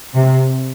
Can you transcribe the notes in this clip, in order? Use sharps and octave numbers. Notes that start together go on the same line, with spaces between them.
C3